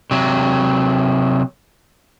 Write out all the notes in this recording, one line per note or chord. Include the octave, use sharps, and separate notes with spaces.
C3 F#3